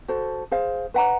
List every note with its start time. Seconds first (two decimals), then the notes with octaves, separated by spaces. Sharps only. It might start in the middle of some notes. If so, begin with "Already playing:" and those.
0.08 F#4 A4 C5
0.51 G#4 C5 F5
0.94 B4 D#5 F#5 A#5